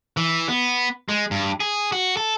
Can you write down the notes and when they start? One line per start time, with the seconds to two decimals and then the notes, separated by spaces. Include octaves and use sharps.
0.17 E3
0.49 B3
1.09 G#3
1.31 G2
1.60 G#4
1.92 F#4
2.17 A4